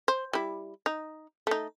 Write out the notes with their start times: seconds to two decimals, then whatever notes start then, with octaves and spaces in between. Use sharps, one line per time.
0.08 C5
0.33 G3 E4
0.86 D#4
1.47 A3 D#4